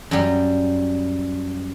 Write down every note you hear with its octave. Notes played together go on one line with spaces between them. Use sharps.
F#2 G3